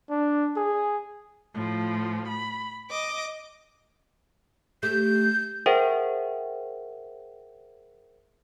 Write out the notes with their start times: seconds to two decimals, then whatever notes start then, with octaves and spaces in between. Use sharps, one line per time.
0.10 D4
0.56 G#4
1.54 A2 F3
2.28 B5
2.90 D#5 D6
4.83 A3 G4 G6
5.66 G#4 A#4 C5 E5 F#5 G5